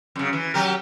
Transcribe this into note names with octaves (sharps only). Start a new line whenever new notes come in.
F#2 C#3
E3
F#3 G4 A#4